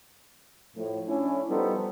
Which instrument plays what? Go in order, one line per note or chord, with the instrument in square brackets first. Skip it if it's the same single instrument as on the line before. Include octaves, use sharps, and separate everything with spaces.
[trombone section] A2 F3
C#4 D4 E4
F3 G3 B3 D#4 A4 C5